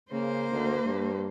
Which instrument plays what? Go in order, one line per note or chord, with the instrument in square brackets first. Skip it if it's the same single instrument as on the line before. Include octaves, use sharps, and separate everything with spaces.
[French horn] C#3 [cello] A#3 C5
[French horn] D2
G2